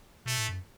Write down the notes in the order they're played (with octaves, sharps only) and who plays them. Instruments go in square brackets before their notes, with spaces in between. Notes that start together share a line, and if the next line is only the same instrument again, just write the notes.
[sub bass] B2 [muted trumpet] A3
[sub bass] A2
F#2